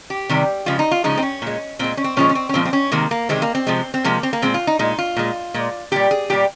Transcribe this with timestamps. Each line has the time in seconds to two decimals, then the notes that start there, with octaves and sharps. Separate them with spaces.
0.10 G4
0.29 C3 D#3 G3
0.66 C#3 F3 G#3 F4
0.79 D#4
0.91 F4
1.04 C#3 F3 G#3 D#4
1.17 C4
1.22 C#4
1.42 A#2 G#3
1.79 A#2 G#3 C4
1.97 C#4
2.04 C4
2.17 A#2 F3 G#3 C#4
2.29 C#4
2.35 C4
2.49 C#4
2.54 A#2 F3 G#3 C4
2.65 C4
2.73 C#4
2.92 C3 D#3 G#3 A#3
3.11 A#3
3.29 C3 D#3 G#3 C4
3.42 A#3
3.55 C4
3.67 C3 F3 G#3
3.94 C4
4.04 C3 F3 G#3 A#3
4.23 C4
4.33 A#3
4.42 A#2 G#3 C4
4.54 F4
4.67 D#4
4.79 A#2 G#3 D#4
4.98 F4
5.16 A#2 G#3
5.54 A#2 G#3
5.92 A#2 G3 G4
6.11 G#4
6.30 A#2 G3 G4